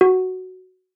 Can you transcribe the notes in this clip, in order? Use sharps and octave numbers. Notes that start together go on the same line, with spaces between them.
F#4